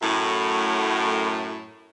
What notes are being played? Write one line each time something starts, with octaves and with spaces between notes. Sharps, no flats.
F#2 A2